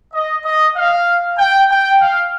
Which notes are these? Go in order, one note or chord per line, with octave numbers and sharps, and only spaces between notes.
D#5
D#5
F5
G5
G5
F5